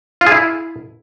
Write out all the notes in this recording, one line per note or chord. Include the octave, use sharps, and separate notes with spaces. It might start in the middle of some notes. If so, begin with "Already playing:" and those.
F4
G#4
E4